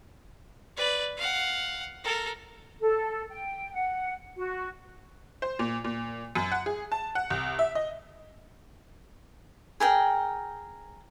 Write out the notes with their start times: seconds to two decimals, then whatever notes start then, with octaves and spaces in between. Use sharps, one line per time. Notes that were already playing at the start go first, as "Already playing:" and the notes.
0.77 B4 D5
1.17 F5 F#5
2.03 A4 A#4
2.80 A4
3.29 G5
3.73 F#5
4.36 F#4
5.42 C5
5.59 A#2
5.84 A#2
6.35 F#2
6.52 F#5
6.66 G#4
6.92 A5
7.15 F#5
7.30 C2
7.59 E5
7.75 D#5
9.80 G#4 A#4 G5